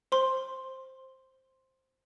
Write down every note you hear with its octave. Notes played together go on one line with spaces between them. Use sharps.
C5 C6